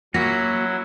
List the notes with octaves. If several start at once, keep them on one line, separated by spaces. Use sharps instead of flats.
F#3 A#3 C#4 E4 F#4 A#6